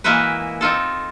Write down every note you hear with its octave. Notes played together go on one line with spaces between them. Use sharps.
E3 G#3 A#3 E4 F#4 B4
C4 D#4 F4 A4